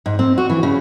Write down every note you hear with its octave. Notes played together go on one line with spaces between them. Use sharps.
G#2
C4
F#4
E3
C#3